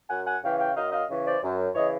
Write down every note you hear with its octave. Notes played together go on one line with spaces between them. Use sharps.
F#2 F#5 G#5
F#5 G#5
C#3 E3 F5 G5
F5 G5
F#2 D#5 F5
D#5 F5
C#3 E3
C5 D5
F#2
C#3 E3 C#5 D#5